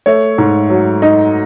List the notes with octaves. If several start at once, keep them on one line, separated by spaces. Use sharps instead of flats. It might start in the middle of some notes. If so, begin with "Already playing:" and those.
A3 C#5
G#2
F#3
D#4